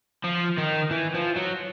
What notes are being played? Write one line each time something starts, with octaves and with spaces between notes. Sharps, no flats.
F3
D#3
E3
F3
F#3